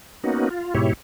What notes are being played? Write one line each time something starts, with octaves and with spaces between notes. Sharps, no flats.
A#3 B3 C#4 D#4 F#4
F4
G#2 B2 E4 G4 C#5